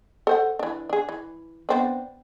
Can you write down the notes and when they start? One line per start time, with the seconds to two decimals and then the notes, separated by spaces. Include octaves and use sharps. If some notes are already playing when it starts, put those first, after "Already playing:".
0.27 A4 C5 F#5
0.59 E3 D4
0.90 D4 G#4
1.09 E3
1.69 B3 C4 D4